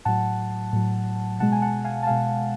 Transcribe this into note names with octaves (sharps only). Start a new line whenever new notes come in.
A2 F#3 F#5 A5
A2 F#3
B2 G#3 F#5 A5
G#5
F#5 A5
F5 G#5
A5
B2 G#3 F5 G#5